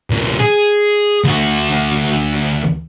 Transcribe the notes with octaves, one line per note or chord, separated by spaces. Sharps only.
D2 A#2
G#4
D2 F#4